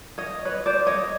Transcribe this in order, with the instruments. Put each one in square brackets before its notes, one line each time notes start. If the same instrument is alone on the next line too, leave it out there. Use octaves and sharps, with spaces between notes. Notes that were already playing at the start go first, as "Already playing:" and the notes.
[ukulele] C#5 D#5
B4 C#5
C5 D5
C#5 D#5